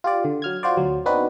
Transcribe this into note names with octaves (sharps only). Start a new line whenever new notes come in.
F4 G4 D5
D3
F#3 F6 G#6
F4 F#4 C5 D5
D2 F#3
B3 C4 D4 D#4 F#4 B4